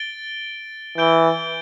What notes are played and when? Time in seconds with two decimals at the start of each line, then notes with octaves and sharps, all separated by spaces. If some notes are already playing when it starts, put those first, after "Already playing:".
Already playing: A6 D7 G7
0.97 E3 G6 D7 G7